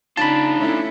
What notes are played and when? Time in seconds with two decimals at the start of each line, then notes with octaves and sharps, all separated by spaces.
0.17 C#3 D4 D#4 F4 A5 B5
0.58 A3 C#4 E4